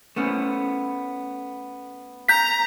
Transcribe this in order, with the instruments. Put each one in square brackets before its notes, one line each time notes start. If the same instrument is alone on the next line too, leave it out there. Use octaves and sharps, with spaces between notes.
[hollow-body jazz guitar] A3 B3 C#4
[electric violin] A#5 [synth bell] G6 B6